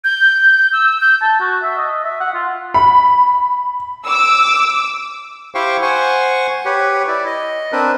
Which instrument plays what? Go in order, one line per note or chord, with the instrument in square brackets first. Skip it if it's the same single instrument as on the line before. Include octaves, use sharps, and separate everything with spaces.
[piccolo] G6
E6
G6
[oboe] A5
F#4
E5
D#5
E5
F#5
F4
[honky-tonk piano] B5
[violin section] D6 E6
[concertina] E4 G4 C5 F5 G5 C#6
C5 F#5 G#5 C#6
G4 B4 C#5
E4 D5
D#5
C4 D4 A#4 B4